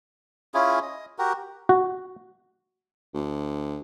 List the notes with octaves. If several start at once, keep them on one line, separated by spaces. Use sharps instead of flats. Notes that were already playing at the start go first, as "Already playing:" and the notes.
C#4 E4 F4 G#4
D#5
F#4 G4 A#4
F#4
D2